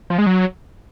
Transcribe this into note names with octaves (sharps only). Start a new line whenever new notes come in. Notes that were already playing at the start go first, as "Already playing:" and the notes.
F3
G#3
F#3